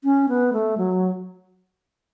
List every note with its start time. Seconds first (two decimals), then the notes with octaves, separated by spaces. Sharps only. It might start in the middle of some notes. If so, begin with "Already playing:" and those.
0.04 C#4
0.29 B3
0.53 A3
0.78 F#3